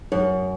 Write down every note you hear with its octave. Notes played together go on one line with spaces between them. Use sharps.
F#2